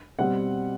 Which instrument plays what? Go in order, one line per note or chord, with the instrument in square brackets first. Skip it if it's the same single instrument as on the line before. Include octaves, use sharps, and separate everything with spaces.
[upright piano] B2 G3 C4 F#5